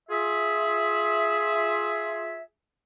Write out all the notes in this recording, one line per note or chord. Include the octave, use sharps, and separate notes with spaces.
F4 G#4 E5